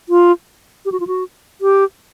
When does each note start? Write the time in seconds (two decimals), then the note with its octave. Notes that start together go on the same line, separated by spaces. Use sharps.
0.09 F4
0.85 G4
0.92 F#4
1.00 F4
1.07 F#4
1.61 G4